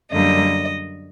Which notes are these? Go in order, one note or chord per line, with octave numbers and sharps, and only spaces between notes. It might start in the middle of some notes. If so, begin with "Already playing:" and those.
F#2 D3 G3 A#3 D#5